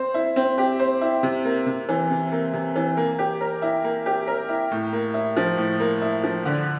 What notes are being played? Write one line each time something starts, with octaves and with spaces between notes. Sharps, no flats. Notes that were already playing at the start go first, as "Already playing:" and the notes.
Already playing: C4 C5
E4
C4
G4
C5
E4
C3
A#3
C3
E3
C3
A#3
C3
E3
A#3
G4
A#4
E4
A#3
G4
A#4
E4
A2
A#3
E4
F3
A2
A#3
E4
F3
D3